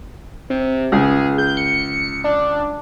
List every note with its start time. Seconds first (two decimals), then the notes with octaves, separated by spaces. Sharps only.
0.50 C3
0.92 C#2 G#4
1.38 G6
1.57 C#7
2.24 D4